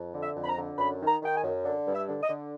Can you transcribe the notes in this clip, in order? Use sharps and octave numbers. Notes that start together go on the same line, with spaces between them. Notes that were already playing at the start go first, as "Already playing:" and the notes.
Already playing: F2
D3
E5
F2
B5
A#5
D3
F#2 B5
D#3
A#5
D#3 G5
G#5
F#2
D3
G2
E5
D3
D#5
D3